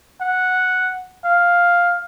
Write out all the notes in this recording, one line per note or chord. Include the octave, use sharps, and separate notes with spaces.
F#5
F5